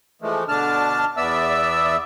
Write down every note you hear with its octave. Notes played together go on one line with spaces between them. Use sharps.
E3 F3 G#3 A3
B2 D3 D4 A5 F6
E2 B3 D5 E5 E6